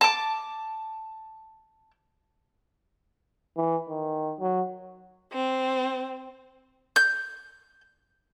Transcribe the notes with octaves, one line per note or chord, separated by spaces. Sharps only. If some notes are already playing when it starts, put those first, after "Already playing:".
A5 D6
E3
D#3
F#3
C4
G6